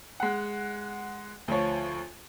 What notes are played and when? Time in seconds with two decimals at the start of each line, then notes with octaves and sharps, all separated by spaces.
0.20 G#3 F#5
1.48 D2 F3 C#5